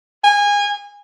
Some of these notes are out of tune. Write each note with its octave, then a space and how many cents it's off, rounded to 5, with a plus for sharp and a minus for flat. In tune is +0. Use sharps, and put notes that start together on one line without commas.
G#5 -25